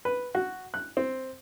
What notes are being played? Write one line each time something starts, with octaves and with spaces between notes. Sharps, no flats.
B4
F#4
F#6
C4